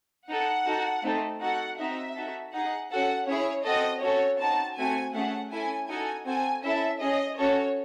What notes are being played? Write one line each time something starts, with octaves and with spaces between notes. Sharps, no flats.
D#4 A4 F#5
D#4 F#4 A4
A3 C4 D#4 A4
D#4 F#4 A4 F#5
C4 D#4 F#4 E5
D#4 F#4 A4
D#4 G#4 F#5
C#4 F#4 A4 F#5
C#4 E4 G#4 C#5
C4 F#4 A4 D#5
C#4 F#4 A4 C#5
C4 D#4 F#4 A5
A3 C4 F#4 G#5
A3 C#4 G#4 F#5
C#4 E4 A4 G#5
D#4 F#4 A4 G#5
C4 F#4 A4 G#5
C#4 E4 A4 E5
C#4 G#4 D#5
C#4 F#4 A4 C#5